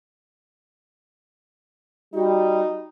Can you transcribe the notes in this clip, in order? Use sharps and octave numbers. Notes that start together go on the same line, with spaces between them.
G3 D#4 F#4